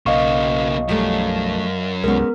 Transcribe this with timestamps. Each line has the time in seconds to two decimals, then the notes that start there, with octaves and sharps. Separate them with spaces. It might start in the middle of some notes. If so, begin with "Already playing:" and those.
0.06 B1 C#3 A#3 D#5 F5 C#6
0.89 F#2 F3 G3 A3
2.04 C2 G#3 B3 C#4 A#4